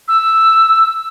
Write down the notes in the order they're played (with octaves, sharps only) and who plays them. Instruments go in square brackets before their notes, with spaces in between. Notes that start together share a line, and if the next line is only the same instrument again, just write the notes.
[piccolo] E6